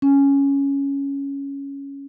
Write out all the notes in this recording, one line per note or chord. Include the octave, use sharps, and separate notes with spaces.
C#4